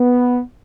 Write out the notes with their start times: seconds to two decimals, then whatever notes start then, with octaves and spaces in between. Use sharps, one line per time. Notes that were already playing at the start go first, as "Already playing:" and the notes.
Already playing: B3